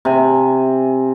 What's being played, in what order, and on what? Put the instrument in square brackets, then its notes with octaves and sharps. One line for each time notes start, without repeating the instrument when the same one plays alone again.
[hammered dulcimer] C3 G#5